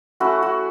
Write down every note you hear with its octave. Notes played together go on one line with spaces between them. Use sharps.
A3 C#4 E4 F#4
F#4